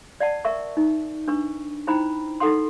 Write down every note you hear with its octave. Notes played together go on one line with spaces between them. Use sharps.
D5 F#5 A5
A#4 E5 C#6
D#4
D4 B4 C#6
D#4 E4 C5 G5 A#5 B5
D#4 A4 B4 F#5 C6